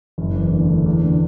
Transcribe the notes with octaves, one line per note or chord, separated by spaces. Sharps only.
F#1
E2
D3
A3
E2
D3